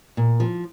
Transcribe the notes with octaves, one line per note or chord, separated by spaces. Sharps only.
A#2
F3